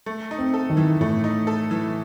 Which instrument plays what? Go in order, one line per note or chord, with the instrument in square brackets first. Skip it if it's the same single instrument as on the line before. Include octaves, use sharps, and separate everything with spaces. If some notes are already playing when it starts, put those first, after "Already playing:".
[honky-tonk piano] A3
D#4
[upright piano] C4
[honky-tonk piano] A4
[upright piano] D#3
[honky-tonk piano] E3
[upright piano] A2 [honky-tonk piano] A3
[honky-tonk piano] D#4
A4
E3